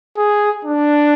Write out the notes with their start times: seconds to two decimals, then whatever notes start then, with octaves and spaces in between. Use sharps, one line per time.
0.17 G#4
0.65 D4